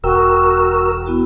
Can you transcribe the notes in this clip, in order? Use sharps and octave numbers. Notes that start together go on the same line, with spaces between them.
E1 F#4 A#4 G5 E6
B3 E4 F#4